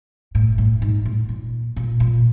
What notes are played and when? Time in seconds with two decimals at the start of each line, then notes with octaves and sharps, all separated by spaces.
0.35 A2
0.58 A2
0.82 G#2
1.05 A2
1.29 A#2
1.76 A#2
2.00 A#2